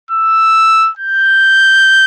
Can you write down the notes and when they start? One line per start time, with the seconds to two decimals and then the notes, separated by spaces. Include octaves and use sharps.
0.11 E6
0.99 G6